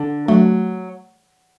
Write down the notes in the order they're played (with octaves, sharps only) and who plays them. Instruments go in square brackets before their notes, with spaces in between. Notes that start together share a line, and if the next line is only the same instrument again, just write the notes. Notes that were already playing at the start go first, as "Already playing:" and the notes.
Already playing: [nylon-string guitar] D3
[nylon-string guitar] F#3 [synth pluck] A3